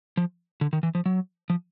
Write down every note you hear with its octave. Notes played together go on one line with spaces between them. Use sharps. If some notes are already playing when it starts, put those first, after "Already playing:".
F3
D3
D#3
E3
F3
F#3
F3